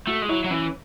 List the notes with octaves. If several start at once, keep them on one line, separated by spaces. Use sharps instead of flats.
A3 F#4
G#3
F#3 E4
F#3
E3 C#4